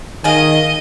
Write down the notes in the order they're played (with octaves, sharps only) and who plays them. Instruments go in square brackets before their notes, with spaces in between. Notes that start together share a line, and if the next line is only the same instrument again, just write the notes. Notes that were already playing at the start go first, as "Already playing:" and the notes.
[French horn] D#3 [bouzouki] G#4 A#4 F5 [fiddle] D#5